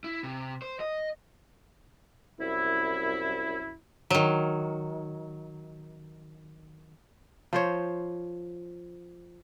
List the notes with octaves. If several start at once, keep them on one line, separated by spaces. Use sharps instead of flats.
E4
C3
C5
D#5
C2 F#2 E4
D#3 F#3
F3 C5 C#5